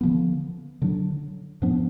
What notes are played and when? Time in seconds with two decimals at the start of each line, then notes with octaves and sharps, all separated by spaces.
0.01 D3 F3 B3
0.82 D3 F#3 D4
1.62 G#2 F3 B3 D4